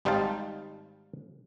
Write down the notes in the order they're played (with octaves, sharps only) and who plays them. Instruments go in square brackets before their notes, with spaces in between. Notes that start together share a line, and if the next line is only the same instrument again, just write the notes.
[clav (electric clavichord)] G#1 G3 D#4 C5 F5 A5